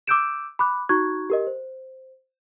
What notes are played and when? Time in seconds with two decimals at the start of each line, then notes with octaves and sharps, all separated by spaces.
0.07 D6 E6 F#6 G6 D7 E7
0.59 B5 D6 F#6
0.89 D#4 F#4 A#5 C#6 F#6 G#6
1.30 G4 A#4 D#5
1.47 C5